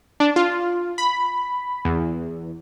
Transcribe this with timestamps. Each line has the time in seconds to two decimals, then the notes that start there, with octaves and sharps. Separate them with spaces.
0.20 D4
0.36 F4
0.98 B5
1.85 E2